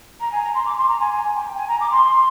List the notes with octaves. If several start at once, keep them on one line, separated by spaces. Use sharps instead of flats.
A#5
G#5
A#5
C6
D6
C6
A#5
G#5
G#5
G5
G#5
A#5
D6
C6